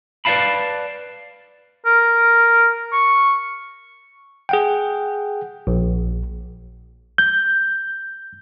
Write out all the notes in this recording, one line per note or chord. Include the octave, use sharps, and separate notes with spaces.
B4 D5 E5 F5 A5 B5
A#4
C#6
G#4 F#5 G5
A#1
G6